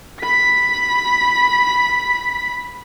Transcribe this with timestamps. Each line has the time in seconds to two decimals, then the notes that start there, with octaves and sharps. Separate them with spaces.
0.21 B5 B6